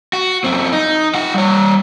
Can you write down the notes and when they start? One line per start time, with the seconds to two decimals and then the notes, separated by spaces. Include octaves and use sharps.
0.13 F#4
0.44 F#2 C4
0.73 D#4
1.15 F4 F#5
1.34 G3 C#5